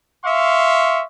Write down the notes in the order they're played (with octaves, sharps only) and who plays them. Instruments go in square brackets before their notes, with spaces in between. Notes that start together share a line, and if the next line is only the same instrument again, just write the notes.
[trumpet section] E5 F5 C6 C#6